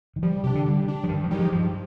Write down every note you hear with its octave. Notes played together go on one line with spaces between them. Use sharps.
D#3
F3 G3
C3 D4 G4
D3
D3 G3
D4 G4
F3
G2 D#3
F3
D#3 G3 G#3 D#4 G4
F3
G2 F3